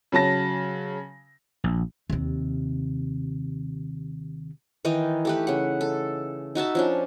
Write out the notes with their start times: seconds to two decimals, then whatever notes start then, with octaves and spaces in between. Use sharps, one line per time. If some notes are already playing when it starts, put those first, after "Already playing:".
0.12 C#3 F#3 A5 A#6
1.64 A#1
2.10 D#2 C3
4.85 D#3 E3 D#4 D#5
5.25 A3 G4 B4
5.47 C#3 F#5
5.81 A4
6.55 D#4 F#4 E5 A5
6.75 F3 C#4 D4